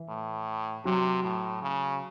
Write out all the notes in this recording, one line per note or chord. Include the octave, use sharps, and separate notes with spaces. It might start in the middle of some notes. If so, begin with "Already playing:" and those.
Already playing: E3
A2
C3 F#3
A2
C#3